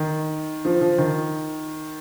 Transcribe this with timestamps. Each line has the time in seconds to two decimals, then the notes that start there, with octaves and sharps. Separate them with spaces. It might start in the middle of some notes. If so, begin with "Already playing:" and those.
Already playing: D#3
0.65 F3
0.81 F3
0.98 D#3